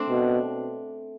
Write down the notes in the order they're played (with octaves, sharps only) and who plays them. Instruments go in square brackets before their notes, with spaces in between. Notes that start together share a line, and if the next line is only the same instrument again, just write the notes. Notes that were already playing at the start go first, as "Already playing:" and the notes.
Already playing: [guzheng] A3 C4 D4
[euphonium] B2